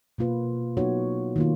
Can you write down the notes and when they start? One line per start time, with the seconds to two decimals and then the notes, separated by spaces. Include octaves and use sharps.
0.18 B2 A#3 F4 B4
0.77 F#3 B3 D#4 F#4 C#5
1.36 D#3 A#3 F4